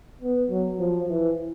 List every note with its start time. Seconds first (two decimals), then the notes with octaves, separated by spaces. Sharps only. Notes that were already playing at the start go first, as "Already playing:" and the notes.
0.21 B3
0.50 F#3
0.79 F3
1.09 E3